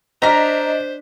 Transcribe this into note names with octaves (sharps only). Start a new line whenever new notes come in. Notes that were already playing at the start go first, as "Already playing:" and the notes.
D4 C5 D#5 A#5 F6 B6